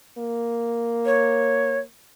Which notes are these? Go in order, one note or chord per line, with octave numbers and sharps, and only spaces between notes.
A#3
C#5